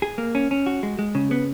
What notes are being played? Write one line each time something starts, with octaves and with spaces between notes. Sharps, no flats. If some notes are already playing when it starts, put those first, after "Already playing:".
G#4
A#3
C#4
C#4
F#4
G#3
G#3
C#3
B3